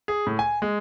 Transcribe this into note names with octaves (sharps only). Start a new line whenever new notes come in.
G#4
A2
G#5
G#3